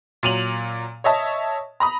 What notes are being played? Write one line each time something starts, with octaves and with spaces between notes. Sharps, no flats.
A#2 F#3 D#7 F7 F#7
C#5 D#5 E5 A5
A#5 B5 D#6